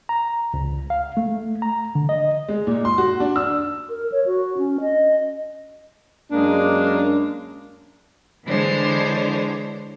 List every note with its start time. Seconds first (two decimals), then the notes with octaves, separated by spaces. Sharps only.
0.09 A#5
0.54 C#2
0.90 F5
1.17 A3
1.62 A#5
1.95 D3
2.09 D#5
2.48 G#3
2.67 A#2
2.85 C6
2.98 F#4
3.20 D4
3.36 E6
3.89 A#4
4.12 C#5
4.26 F#4
4.58 C#4
4.81 D#5
6.31 F#2 G#3 A#3 D4
8.47 D3 E3 G#3 D4 C5 C#5